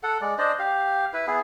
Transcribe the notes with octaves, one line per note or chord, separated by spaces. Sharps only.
A4 F#5
G#3 D5
D4 C5 D5 D#5
G4 F5
E4 B4
B3 E4 G#4